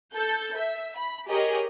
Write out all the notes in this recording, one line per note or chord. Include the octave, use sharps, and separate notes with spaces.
A4 G6
E5
B5
G4 G#4 A#4 C#5 D#5